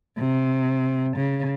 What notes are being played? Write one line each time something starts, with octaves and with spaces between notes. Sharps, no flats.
C3
C#3